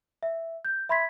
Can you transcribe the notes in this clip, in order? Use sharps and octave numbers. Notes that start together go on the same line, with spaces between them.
E5
G6
E5 B5 C6 G#6 B6